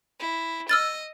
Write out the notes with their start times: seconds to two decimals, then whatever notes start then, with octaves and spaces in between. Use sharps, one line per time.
0.20 E4
0.69 D#5 E6 F6 A6